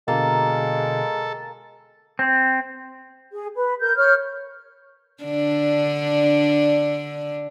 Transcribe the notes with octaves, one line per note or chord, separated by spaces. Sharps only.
B2 D3 G#3 A#3 A4 F5 G5
C4
G#4
B4
A#4 G6
C#5 F6 G6
D3 D4